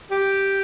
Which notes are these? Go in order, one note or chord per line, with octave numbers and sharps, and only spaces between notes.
G4